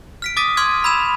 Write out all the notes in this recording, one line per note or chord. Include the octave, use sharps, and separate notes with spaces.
F6 B6 D7
D6 D#6 A6 B6 D#7
C6 D6 F6 G#6
B5 E6 G#6 E7 F7